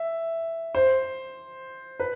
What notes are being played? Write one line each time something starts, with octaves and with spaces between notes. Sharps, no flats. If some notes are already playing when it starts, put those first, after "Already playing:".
Already playing: E5
C5
B4